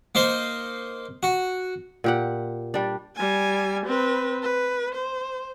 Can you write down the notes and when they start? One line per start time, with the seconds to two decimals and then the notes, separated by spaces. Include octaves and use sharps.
0.15 A#3 D#4 C5 C6
1.23 F#4
2.04 A#2 G4 F#5
2.74 G3 D4
3.16 G3 G#5
3.87 C4 B4
4.43 B4
4.95 C5